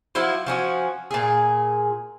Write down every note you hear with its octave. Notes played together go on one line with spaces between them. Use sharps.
F3 F#3 E4 F#4
F3 C#4 D#4 F#4
A#2 G#4